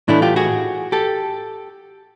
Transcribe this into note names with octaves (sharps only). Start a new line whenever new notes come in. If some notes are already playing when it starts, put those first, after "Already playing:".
A2 E3 A3 D4 E4
F4 G4
F#4 G#4
G4 A4